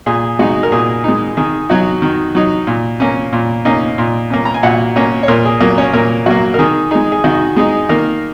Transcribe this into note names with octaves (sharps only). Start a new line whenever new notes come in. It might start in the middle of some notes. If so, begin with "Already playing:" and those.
A#2 G#4
G#3 D#4 F#4
A#4
A#2 G#4
G#3 D#4
D#3 G#4
F#3 D#4 F#4
D#3
F#3 D#4
A#2
A#3 C#4
A#2
A#3 C#4 D#4 D#5
A#2
A#3 C#4
A#5
G#5
A#2 F#4 F#5
A#3 C#4 C#5
C#5
A#2 A#3 A#4
G#4
F#3 A#3 A#4
C#4 C#5
A#2 A#3 A#4
F#3 A#3 F#4
A#4
D#3 G#4
G#3 D#4 G#4
G#4
D#3 F#4
G#3 D#4 G#4
D#3 A#3 A#4